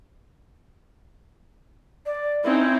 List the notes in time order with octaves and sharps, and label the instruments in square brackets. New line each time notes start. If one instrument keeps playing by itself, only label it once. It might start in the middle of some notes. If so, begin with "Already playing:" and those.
[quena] D5
[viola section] C4 C#4 D#4 [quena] E4